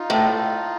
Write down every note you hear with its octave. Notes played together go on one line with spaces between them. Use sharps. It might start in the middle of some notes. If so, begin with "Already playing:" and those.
Already playing: D#4 F4
A2